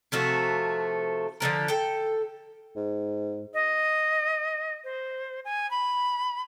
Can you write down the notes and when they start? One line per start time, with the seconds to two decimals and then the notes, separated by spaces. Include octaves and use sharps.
0.12 C3 F3 A3 F#4
1.40 D3 F3 B3 A#4
1.68 A4 G5
2.76 G#2
3.53 D#5
4.84 C5
5.45 G#5
5.71 B5